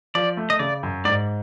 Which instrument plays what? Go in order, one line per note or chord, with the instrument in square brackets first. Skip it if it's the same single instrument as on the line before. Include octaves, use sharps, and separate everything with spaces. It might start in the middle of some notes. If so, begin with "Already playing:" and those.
[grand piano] F3 [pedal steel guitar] D5
[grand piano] A3
[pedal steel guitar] D#5
[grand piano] C#3 [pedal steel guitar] D5
[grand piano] F#2
[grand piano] G#2 [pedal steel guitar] D5